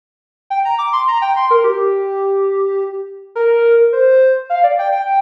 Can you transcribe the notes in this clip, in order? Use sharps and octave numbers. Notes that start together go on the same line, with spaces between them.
G5
A#5
D6
C6
A#5
G5
C6
A#4
G4
A#4
C5
F5
D5
G5
G5